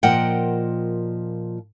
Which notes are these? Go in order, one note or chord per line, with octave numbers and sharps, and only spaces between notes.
A#2 F3 A#4 D#5 F#5 G5